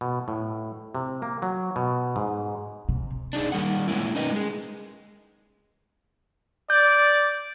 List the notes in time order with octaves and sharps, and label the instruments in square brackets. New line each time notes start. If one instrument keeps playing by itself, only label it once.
[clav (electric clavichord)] B2
A2
C3
A#3
F#3
B2
G#2
[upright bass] C3
[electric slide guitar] D4 D#4 G#4
D#3 G3 A#3 F#5
G#3 A#3 C#4 E4
C#4 D#4 A#4 B4 D#5
G#3 G#4
[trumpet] D5 [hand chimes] G6